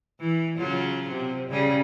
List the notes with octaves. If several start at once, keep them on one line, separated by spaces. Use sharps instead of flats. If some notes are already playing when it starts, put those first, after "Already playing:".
E3
C#3 F#3 F4
C3
C#3 G3 C#4